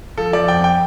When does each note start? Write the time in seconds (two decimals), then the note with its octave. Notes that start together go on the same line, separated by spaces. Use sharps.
0.17 F3 A4
0.33 F3 D5
0.48 F2 G5
0.64 G5